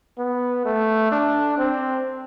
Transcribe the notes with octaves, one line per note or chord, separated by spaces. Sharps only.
B3
A3
D4
C4